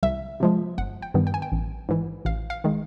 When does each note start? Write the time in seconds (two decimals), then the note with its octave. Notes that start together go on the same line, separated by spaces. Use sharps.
0.03 C2 E5
0.40 C3 F3 G#3
0.78 G1 F#5
1.02 G5
1.14 G2 D#3 G3 B3
1.27 G5
1.34 G#5
1.42 G5
1.52 A1
1.89 G#2 E3
2.25 A1 F5
2.50 F5
2.64 D#3 G#3